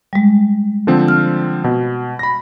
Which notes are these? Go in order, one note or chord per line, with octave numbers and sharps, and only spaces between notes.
G3 G#3
D3 F3 C4
F6
B2
B5 A#6